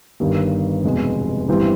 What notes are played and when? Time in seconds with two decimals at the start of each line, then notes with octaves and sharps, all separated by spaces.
0.20 G1 G2 D#3 G3
0.84 F1 E2 B2 G#3 B3
1.48 G1 G2 E3 G3 C4